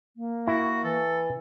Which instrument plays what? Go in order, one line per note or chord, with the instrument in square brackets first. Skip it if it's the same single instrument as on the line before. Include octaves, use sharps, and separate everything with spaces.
[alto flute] A#3
[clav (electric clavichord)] E4 [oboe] F#4
[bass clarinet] E3 [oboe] A4